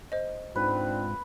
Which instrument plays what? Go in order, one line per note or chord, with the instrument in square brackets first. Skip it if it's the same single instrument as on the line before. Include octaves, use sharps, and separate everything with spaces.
[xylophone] C5 D#5
[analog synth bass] G#2 [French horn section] C4 D4 F4 [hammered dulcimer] B4